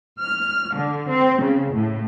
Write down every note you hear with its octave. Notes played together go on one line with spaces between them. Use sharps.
F6
D3
C4
C#3
A2